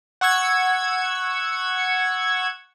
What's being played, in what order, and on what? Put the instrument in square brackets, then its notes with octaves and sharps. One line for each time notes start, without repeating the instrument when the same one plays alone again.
[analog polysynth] F#5 C#6 E6 G#6